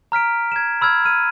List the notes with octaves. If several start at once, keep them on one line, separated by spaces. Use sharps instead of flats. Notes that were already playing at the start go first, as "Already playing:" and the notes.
A#5 F6 B6 D7
G#6 E7
B5 E6 F6 G#6
F6 D#7